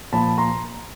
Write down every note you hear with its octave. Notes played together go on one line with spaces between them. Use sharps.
A#2 F3 A5 B5
A#5 C6